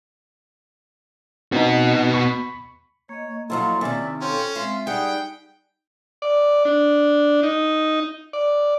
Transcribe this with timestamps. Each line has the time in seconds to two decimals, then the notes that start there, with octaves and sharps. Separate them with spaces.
1.52 B3 C4 D#4 F#4
2.14 B5 C#6
3.09 A#3 C#5 D#5
3.50 F#2 F3 F#3 E4 F4 A4
3.81 C3 D#3 C#4 D5 E5
4.21 C#4 F4 A4 C5 C#5 G5
4.55 G#3 C4 F4 E5 C6
4.87 G3 D#4 G#4 F#5 G5
6.22 D5
6.65 D4
7.43 D#4
8.33 D5